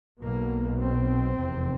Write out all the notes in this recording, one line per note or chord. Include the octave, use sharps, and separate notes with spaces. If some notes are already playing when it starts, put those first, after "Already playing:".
B1 B2 A#3
C4
F1 E2 C3